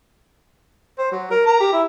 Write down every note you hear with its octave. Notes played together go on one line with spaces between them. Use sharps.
C5
F#3
A#4
A#4 A#5
G4
E4